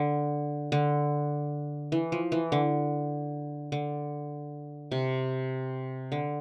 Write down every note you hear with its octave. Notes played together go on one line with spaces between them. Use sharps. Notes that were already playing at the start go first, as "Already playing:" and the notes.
Already playing: D3
D3
E3
F3
E3
D3
D3
C3
D3